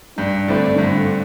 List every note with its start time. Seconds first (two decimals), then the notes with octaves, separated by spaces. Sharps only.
0.17 G2 D4
0.48 D3 A3 C4 E4
0.78 G2 D3